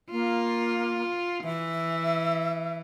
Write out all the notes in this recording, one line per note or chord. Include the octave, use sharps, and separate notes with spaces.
A#3 F4
E3 E5